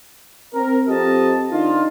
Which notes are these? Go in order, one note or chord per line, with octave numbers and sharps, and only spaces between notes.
C4 A#4
F3 C4 G4 A4 D#5 A5
D#3 D4 D#4 F4